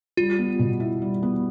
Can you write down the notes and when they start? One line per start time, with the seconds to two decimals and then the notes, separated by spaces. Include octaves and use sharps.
0.17 G3 F4
0.39 B3
0.59 B2
0.80 E4
1.02 G3
1.23 B3